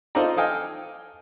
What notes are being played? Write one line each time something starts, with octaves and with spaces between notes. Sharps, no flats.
D#4 F4 A4 C5 D5 A#5
A4 D#5 F5 G5 G#5